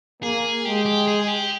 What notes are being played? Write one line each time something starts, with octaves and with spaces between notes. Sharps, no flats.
A#3 G#4
G#3 G4
G4
G#4
G4